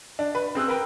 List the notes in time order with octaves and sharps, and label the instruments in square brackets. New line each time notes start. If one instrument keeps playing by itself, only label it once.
[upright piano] D4
B4
C4 G#4 E6 F#6
A#4 B4 G5